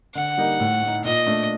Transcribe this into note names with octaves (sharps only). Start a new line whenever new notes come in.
D3 F#5
G3 A#3 D#4
A2
A3 D#4
A#2 D#5
A3 D4